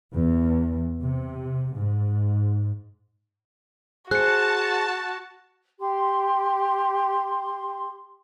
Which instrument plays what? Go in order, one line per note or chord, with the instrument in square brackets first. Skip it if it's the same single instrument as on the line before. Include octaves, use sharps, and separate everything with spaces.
[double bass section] E2
C3
G#2
[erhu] F#4 [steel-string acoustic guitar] G#4 C5 [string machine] A5 [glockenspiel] F#6 C#7
[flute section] G4 C6